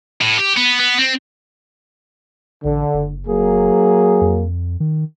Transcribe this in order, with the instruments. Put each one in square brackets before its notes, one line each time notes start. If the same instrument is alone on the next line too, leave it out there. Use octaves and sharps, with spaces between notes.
[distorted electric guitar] A2
G4
B3
B3
C4
[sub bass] A1 [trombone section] D3
[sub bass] F#1
[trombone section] F#3 A#3 G#4
[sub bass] F2
D#3